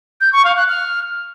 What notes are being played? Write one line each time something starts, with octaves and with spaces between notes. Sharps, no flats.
G6
C#6
F5
F#6
F6